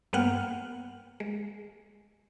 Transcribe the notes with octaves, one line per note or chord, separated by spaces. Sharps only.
G2 A#3 B3 F#5 G5 F6
G#3